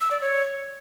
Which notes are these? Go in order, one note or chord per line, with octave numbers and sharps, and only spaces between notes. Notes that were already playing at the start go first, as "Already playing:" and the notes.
E6
D5
C#5